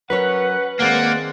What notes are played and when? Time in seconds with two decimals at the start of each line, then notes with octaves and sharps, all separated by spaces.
0.10 F#3 C#4 A#4 B4 C#5 F#5
0.80 D#3 G#3 A#3 C4 D5 F#5